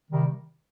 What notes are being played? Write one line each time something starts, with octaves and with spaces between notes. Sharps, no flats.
C3 D#3 G3